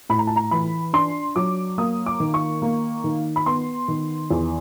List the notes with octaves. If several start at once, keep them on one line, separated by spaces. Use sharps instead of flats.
A2 B5
A#5
A5
A#5
E3 B5
D4 C6
F#3 D6
A#3 D#6
D6
D#3
C#6
A#3
D#3
B5
B3 C6
D#3
E2